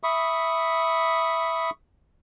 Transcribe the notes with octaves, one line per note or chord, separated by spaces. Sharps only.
E5 B5 C#6 D#6